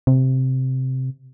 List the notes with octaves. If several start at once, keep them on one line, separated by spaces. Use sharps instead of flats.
C3